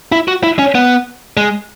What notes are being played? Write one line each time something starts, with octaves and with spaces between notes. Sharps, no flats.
E4
F#4
E4
C#4
B3
G#3